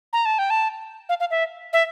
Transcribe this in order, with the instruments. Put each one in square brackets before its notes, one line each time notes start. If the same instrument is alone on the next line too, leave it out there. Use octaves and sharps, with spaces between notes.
[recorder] A#5
A5
G5
A5
F5
F5
E5
E5